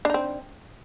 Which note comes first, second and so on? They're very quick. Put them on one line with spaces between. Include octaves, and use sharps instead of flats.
D4 D#4 C4